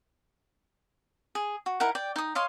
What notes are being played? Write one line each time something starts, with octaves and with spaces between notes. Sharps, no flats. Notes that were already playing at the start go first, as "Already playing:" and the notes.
G#4
F#4
D#4 E4 A#4 F#5
D5 G5
D#4 D#6
C#5 D#5 F5 C6